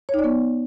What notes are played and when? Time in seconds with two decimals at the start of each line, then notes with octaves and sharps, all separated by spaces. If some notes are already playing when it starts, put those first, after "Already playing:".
0.09 C#5
0.14 D#4
0.19 D5
0.24 B3